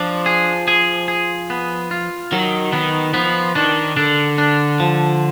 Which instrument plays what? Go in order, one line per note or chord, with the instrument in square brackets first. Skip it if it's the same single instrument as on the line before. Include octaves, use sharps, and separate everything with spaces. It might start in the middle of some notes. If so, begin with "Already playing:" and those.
Already playing: [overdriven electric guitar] F3 [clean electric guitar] D4
[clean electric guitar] G#4
G#4
G#4
B3
F4
[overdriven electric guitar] D#3 [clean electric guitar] F#3
[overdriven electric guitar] D#3 [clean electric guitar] B3
[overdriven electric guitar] F3 [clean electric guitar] B3
[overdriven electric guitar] D#3 [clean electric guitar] D4
[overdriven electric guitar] D3 [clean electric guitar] D4
[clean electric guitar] D4
F3